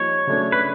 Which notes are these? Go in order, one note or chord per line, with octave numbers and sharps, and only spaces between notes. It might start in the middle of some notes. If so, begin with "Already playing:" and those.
Already playing: F3 A#3 D#4 G4 C#5
C#3 F#3 A3 D4
B4